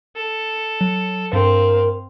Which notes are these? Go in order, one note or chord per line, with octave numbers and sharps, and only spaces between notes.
A4
F#3
G2 C4 A#4 F5